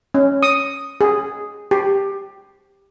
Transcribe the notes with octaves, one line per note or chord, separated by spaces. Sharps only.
C#4
D#6
G#4
G4